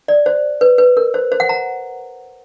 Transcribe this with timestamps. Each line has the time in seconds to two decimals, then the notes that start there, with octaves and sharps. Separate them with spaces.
0.08 D5
0.26 C5
0.61 B4
0.78 B4
0.97 A#4
1.14 C5
1.32 C5
1.40 F#5
1.49 A#5